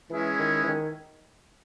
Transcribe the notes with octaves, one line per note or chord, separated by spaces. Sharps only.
E3 G#3 C#4 E4 G#4
D#3
E3
D#3